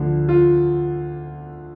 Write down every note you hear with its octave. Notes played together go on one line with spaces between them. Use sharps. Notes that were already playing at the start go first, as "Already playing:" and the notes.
Already playing: D2 D3 F3
F4